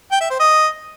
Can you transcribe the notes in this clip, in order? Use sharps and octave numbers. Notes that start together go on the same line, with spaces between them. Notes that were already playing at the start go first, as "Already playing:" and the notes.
G5
E5
C5
D#5